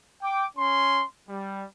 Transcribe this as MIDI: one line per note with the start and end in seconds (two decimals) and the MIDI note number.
0.22 0.45 79
0.22 0.45 86
0.57 1.04 61
0.57 1.04 84
1.29 1.65 55